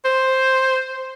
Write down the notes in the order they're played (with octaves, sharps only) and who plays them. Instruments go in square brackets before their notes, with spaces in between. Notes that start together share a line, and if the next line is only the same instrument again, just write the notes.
[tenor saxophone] C5